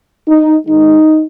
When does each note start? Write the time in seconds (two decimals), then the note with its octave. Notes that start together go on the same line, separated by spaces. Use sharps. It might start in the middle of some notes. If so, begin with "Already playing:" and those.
0.28 D#4
0.67 G#2 D#3 G#3 D#4